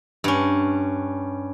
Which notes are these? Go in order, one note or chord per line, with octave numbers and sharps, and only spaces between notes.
G2 C#4